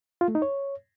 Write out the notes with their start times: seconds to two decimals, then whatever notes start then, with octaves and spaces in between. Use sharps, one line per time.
0.21 F4
0.28 A3
0.35 D#4
0.42 C#5